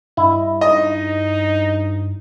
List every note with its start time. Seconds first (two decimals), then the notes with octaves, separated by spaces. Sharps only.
0.17 G2 E4 D#5
0.61 D#4 D#5